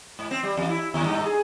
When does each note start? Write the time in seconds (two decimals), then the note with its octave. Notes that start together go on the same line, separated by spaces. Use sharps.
0.19 G#2
0.31 C4
0.43 G3
0.57 E2
0.69 E4
0.94 D#2
1.06 G2
1.26 G#4